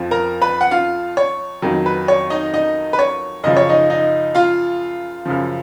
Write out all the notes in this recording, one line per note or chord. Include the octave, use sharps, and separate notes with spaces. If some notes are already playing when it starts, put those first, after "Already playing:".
Already playing: F2 F3
A#4 A#5
B4 B5
F#5
F4 F5
C#5
F2 D#3 F#3
B4
C#5
D#4 D#5
D#4 D#5
B4
C#5
F#2 C#3 F3 D#5
C#5
D#4 D#5
D#4 D#5
F4 F5
F#2 C#3 F3